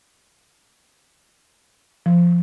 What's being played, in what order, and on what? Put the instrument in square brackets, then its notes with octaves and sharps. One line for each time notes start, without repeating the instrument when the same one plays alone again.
[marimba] F3